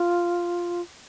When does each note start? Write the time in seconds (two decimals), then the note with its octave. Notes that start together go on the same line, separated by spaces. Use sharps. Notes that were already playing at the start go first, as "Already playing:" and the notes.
Already playing: F4